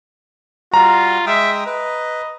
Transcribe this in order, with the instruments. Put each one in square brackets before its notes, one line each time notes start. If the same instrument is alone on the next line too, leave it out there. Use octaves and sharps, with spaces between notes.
[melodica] G3 F#4 [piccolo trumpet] F4 [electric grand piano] A#5
[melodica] G#3 G5 D#6 [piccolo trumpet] E5
[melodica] B4 [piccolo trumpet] D#5